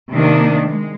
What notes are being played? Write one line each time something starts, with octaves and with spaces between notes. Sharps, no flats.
C3 D#3 A#3 D4
G#3